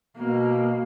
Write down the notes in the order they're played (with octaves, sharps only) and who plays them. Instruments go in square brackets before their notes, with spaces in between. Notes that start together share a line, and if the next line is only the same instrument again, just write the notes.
[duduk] B2 [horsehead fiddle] A#3